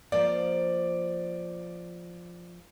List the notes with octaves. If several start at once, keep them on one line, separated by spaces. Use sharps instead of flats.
F3 A#3 D5